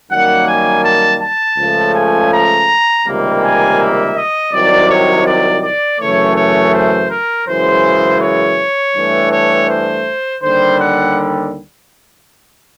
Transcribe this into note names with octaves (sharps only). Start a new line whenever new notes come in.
F#2 D#3 G3 A#3 F#5
G#5
A5
A5
C#2 C#3 F3 A3
G#5
A#5
C#2 C3 D#3 G3 A#3
G#5
E5
D#5
C2 C3 D#3 F#3 D5
C#5
D5
D5
F#2 C#3 E3 A3 C#5
C#5
C5
A#4
F#2 C#3 E3 G#3 C5
C#5
G2 E3 A3
C#5
C5
D#2 D3 G3 C5
F#5